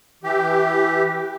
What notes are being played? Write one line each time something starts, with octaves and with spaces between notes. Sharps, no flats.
E3 G4